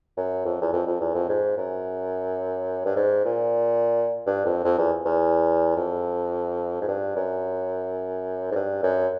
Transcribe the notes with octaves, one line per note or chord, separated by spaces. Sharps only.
F#2
F2
E2
F2
F2
E2
F2
G#2
F#2
G2
G#2
A#2
G2
F2
F2
E2
E2
F2
G#2
G2
F#2
G#2
G2
F#2